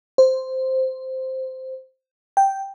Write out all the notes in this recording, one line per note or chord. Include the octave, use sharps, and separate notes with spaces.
C5
G5